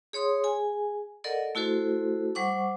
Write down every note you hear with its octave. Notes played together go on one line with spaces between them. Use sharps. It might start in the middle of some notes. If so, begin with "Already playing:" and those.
G#4 C#5 C6 D#6
G#4 G#5
A4 A#4 D5 D#5 F#5
A3 E4 F#4 A4 C5
G3 C5 F#5 C#6 D6